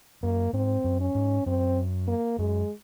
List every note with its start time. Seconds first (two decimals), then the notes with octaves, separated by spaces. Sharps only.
0.23 F#2 A#3
0.53 G#2 C4
0.84 F#2
1.00 C#4
1.15 G#2
1.46 F#2 C4
2.08 A#3
2.38 F#2 G#3